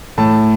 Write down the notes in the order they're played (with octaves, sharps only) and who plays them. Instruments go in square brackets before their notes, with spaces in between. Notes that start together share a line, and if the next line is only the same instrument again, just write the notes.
[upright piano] A2 A5